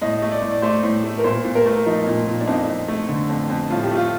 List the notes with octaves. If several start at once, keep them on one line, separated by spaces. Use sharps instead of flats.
A2 D#5
A3
D5
A2
D5
A3 C5
A2
A3
A#4
A#2 C5
A#2
A#4
A3
F3 D#4
A#2
A#2
D4
F2 D#4
F2
A3
D3
F2
F2
A2 F4
G4
A3
F4